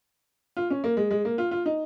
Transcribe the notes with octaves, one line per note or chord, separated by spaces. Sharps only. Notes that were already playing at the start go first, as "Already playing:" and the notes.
F4
C#4
A#3
G#3
G#3
A#3
F4
F4
D#4